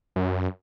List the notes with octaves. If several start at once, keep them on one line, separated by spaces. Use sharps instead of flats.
F#2